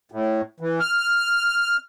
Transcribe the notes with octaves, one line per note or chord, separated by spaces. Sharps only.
A2
E3
F6